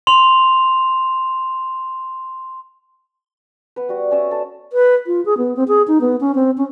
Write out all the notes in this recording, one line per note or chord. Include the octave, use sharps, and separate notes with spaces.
C6 F7
B3 B4
G3 F#4
C#4 D5 E5 D#6
A4
B4
F4
G#4
B3
C4
G#4
D#4
B3
C#4
C4
C#4